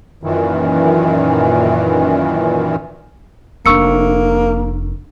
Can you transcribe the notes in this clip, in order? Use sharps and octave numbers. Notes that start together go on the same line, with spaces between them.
F#2 A#2 D#3 E3
F1 A#3 D4 C#6 E6 C#7